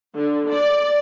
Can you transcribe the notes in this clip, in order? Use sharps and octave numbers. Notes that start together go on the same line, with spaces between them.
D3
D5